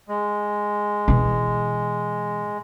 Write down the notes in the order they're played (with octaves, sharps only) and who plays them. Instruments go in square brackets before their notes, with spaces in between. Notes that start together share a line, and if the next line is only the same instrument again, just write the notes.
[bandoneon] G#3
[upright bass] B2 E3